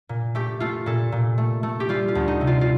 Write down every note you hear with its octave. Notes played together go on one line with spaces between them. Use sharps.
A#2
A3 G4
A3 F4
A#2 A4
A#2
A3
A3
G4
G3 F4
F4
D2
D#4
C3
F4
F4